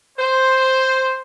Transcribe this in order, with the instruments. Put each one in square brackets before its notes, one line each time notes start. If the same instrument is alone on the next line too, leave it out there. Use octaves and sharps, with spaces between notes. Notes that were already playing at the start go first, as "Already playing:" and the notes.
[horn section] C5